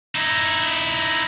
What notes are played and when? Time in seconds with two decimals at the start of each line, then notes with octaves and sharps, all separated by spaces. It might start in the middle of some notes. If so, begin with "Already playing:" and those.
0.15 D#4 E4